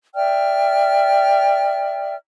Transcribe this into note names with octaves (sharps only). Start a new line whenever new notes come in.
D5 E5 G5 F6